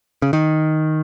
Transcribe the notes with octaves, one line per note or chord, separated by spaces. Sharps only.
C#3
D#3